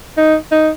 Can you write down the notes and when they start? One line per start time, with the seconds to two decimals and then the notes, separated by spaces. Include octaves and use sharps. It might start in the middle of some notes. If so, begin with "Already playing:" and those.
0.17 D#4
0.52 D#4